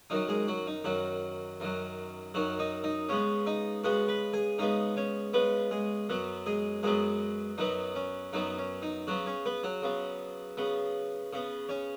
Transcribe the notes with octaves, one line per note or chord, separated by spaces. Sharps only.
F#2 D#3 F#3 D#4
G#3 G#4
F#3 F#4
D#4
F#2 D#3 F#3 F#4
F#2 D#3 F#3
F#2 D#3 F#3 F#4
D#4 D#5
D#4 D#5
C#3 G#3 B3 C#4 C#5
D#4 D#5
C#3 G#3 B3 F#4 F#5
B4 B5
G#4 G#5
C#3 G#3 B3 D#4 D#5
C#4 C#5
C#3 G#3 B3 B4
G#3 G#4
F#2 F#3 B3
G#3 G#4
F#2 F#3 G#3 B3 G#4
F#2 F#3 B3 D#4
C#4
F#2 F#3 B3 D#4
C#4
D#4
C#3 F#3 B3 F#4
C#4 C#5
B3 B4
F#3 F#4
C#3 B3
C#3 B3
C#3 B3
C#4 C#5